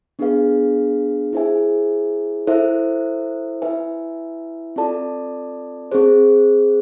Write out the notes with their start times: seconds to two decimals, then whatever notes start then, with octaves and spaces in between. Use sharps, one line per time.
0.19 B3 D4 G#4 B4 F5
1.33 E4 G#4 C5 E5 G#5
2.47 E4 A4 C5 E5
3.62 E4 B4 E5 G#5
4.76 C4 F4 A4 D5 A5
5.91 C4 G#4 C5